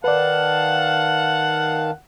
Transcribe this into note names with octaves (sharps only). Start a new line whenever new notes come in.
D#3 B4 D5 F5 F#5 A5